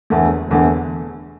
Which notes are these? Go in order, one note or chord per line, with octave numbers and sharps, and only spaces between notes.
E1 E2 D3 A3
E1 E2 D3 A3